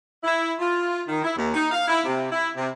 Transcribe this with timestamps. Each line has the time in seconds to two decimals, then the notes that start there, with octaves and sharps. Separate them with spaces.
0.24 E4
0.59 F4
1.08 D#3
1.23 E4
1.36 D#2
1.54 D#4
1.72 F5
1.88 E4
2.05 C3
2.32 E4
2.56 C3